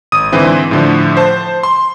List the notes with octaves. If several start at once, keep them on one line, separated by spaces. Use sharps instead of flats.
G#1 D#6 D#7
G#2 D3 E3 C4 E4
A2 D3 F3
C5 A5
C6